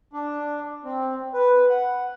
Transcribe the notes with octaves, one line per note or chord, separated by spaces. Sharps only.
D4
C4
B4
F#5